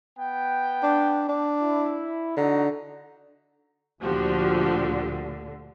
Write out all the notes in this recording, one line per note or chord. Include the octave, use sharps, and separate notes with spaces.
B3 G5
D4
D4
E4
D3 D#4 F#4 A#5
D2 A#2 D3 F3 F#4 G4